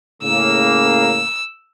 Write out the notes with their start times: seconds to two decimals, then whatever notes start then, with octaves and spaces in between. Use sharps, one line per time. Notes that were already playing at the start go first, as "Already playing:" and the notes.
0.23 A2 C#3 A#3 E6